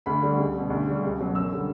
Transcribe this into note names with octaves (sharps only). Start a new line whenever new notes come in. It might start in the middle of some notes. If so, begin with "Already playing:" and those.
D2 B5
D3 G3
C#2
B2 G3
D2
C#3 G3
C#2
B2 F#3
F#2 E6
D3 G3